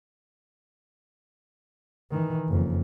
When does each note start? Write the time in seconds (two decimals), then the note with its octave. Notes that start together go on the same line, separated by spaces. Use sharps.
2.11 D#3 E3
2.48 F#1 F2